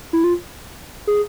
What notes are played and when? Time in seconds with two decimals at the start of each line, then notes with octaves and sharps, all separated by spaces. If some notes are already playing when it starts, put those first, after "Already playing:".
0.13 E4
0.24 F4
1.07 G#4